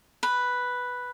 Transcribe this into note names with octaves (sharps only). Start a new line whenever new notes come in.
B4